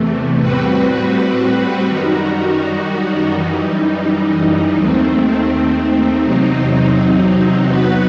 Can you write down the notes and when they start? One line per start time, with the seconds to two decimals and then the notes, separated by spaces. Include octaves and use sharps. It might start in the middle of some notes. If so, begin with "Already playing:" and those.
Already playing: E2 C3 E3 A3
0.39 A2 G3 C4 F#4 B4
1.85 F#2 D#3 G3 D#4 F#4
3.31 F#2 E3 G3 D#4
4.76 D#2 D#3 A3 C4
6.23 E2 C3 F#3 C4 D#4
7.68 F#3 B3 F#4 B4